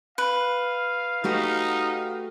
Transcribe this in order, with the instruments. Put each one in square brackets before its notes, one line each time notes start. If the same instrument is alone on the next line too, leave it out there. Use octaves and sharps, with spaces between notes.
[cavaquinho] B4 [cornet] F5
[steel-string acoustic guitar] A3 F#4 G4 [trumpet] D#4